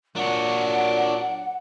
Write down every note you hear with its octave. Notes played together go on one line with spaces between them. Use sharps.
A#2 F#3 D4 C#5 F#5